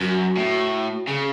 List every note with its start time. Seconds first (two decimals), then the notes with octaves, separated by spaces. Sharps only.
0.01 F#2 F#4
0.37 A2
1.08 C#3 G#4